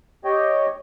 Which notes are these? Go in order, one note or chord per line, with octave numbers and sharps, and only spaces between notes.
G4 C#5 D#5 G5